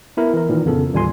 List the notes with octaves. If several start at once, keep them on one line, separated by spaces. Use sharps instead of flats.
B3 E4 A#4
E3 A#4
A#2 D#3 E3
F2 C#3 B3 A4
A1 D#2 G3 F4 G#5 C6